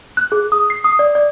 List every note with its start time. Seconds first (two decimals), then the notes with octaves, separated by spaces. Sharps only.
0.17 F#6
0.32 G#4
0.52 D#6
0.70 C7
0.84 D#6
0.99 D5
1.15 D5